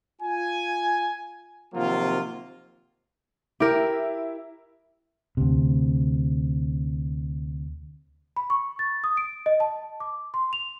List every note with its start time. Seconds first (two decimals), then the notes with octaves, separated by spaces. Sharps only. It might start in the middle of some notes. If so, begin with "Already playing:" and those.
0.22 F4 G#5
1.74 C3 D#3 F3 F#3 A#3 F4
3.60 E4 G4 A#4
5.37 D2 C3
8.36 B5
8.50 C#6
8.79 A6
9.04 D#6
9.17 D7
9.46 D#5
9.60 A5
10.00 D6
10.34 C6
10.53 F7